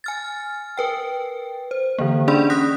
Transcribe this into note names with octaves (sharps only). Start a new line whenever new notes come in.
G#5 F6 A6
A#4 B4 G5
C5
D3 E3 A#3
C#4 D4 G#4 D5 B5 C6
D#6 F#6 A#6 B6